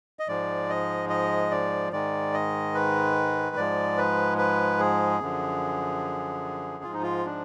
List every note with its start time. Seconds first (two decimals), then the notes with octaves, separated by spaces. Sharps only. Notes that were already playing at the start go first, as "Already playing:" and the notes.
0.19 D#5
0.28 G#2 F3 G#3 D5
0.70 D#5
1.10 D#5
1.51 D5
1.92 G#2 D#3 G#3 D5
2.34 D#5
2.75 B4
3.56 G#2 F3 G#3 D5
3.98 B4
4.38 B4
4.79 G#4
5.20 F#2 D3 F3
6.84 G#2 F3 G#3 F4
6.93 D#4
7.02 F4
7.26 D4